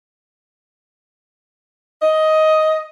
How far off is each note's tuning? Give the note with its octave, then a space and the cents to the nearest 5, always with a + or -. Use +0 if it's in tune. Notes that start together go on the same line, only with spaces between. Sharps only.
D#5 +10